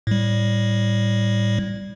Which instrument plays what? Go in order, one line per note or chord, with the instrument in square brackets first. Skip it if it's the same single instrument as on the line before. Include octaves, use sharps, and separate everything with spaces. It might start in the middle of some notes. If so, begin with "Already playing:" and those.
[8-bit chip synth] A2 G3